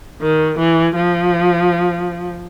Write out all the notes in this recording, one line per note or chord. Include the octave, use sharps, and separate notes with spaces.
D#3
E3
F3